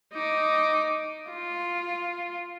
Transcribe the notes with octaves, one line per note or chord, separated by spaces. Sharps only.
D#4 D6
F4